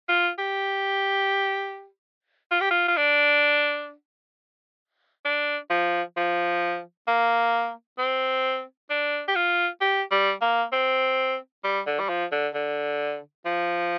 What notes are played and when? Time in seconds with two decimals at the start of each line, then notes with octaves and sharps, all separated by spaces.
0.08 F4
0.38 G4
2.51 F4
2.61 G4
2.71 F4
2.88 F4
2.97 D4
5.25 D4
5.70 F3
6.16 F3
7.07 A#3
7.98 C4
8.90 D4
9.28 G4
9.35 F4
9.81 G4
10.11 G3
10.42 A#3
10.72 C4
11.64 G3
11.87 D3
11.99 G3
12.09 F3
12.32 D3
12.54 D3
13.45 F3